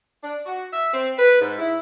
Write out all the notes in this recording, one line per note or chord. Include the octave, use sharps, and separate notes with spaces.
D4
F#4
E5
C4
B4
G#2
E4